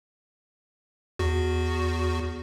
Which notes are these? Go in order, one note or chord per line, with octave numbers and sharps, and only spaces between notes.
E2 F#4